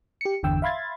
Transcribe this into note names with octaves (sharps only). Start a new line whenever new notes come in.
G4 C#7
G1 E2 D3 G5 E6
E5 F5 B5 C6 G#6 A6